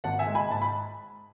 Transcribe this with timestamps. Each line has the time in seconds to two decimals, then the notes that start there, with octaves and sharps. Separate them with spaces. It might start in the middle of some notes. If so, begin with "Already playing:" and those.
0.04 G#1 F#5 A5
0.19 E5 G#5
0.27 G#3
0.35 G#5 B5
0.50 G#2 A5
0.62 B5